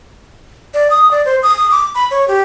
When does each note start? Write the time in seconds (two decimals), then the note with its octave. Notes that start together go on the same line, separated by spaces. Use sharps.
0.74 D5
0.90 D#6
1.11 D5
1.26 C5
1.43 D#6
1.71 D6
1.95 B5
2.11 C#5
2.28 G4